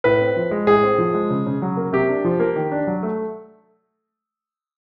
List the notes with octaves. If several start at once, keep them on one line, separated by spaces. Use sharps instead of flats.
A2 B4
C4
F3
G#3
A2 G#4
C4
F3
G#3
C#3
C#3
F#3
A#3
C3 G4
D4
F3
A#3
D#3
D4
F#3
A3